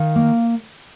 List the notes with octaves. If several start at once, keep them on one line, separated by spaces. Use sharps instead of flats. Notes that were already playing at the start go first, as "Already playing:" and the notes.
Already playing: D#3 F5
A#3